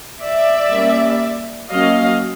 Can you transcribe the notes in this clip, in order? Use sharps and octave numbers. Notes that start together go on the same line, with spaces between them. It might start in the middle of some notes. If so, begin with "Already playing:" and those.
D5 E5
G3 A#3 C#4
F#3 A#3 C#4 D#5 F5